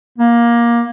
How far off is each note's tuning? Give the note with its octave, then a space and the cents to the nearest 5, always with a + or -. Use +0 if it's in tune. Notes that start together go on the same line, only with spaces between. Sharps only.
A#3 +15